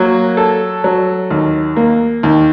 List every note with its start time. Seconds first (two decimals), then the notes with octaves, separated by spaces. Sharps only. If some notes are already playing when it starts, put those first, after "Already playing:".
Already playing: F#3 A#3
0.37 A4
0.84 F#3
1.31 D#2
1.76 A#3
2.23 D#2